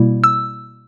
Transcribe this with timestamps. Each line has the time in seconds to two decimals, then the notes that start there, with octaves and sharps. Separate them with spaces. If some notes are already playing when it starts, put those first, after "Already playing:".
Already playing: B2 G3 A#3 E4
0.24 E6